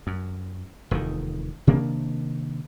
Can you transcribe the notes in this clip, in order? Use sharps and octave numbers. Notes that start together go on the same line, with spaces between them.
F#2
F1 E2 C3 D#3
C3 D#3 A#3 D4